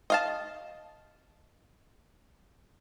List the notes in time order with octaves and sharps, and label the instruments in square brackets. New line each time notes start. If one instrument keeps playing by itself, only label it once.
[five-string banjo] D#5 F5 A5